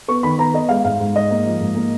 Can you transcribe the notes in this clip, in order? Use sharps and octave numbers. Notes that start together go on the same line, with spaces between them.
B3 C#6
D#3 B5
B3 A#5
B3 D#5
G#3 F5
G#2 F5
G#2
G#2 D#5
A#3
F3
G#2
A#3